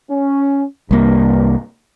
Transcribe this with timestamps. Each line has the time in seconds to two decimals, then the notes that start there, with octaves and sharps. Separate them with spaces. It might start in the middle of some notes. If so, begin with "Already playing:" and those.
0.11 C#4
0.91 C2 G2 A#3